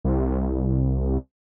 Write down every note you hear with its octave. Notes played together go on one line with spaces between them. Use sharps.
C2